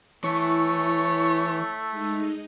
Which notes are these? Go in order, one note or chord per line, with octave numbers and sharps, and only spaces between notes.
E3 A3 E4 C#5
G#3 D#4